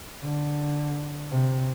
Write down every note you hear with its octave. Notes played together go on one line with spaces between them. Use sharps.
D3
C3